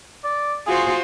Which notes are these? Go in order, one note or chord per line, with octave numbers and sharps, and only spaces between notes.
D5
F4 F#4 G#4 C5